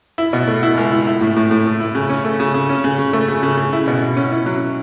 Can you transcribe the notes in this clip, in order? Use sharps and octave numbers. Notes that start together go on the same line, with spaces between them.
E4
B2
A3
E4
C#2
E4
E4
A2
A2
A2
A3
E4
C#3
C#4
A3
C#3
C#3
C#4
C#3
C#3
A3
C#3
C#3
C#3
E4
B2
B2
C#4
E4
F#3